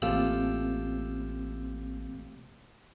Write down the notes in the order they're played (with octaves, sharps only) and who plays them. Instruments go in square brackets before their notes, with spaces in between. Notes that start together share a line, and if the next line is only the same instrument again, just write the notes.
[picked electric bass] A1 [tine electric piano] A3 A#3 C4 [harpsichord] F4 G4 A4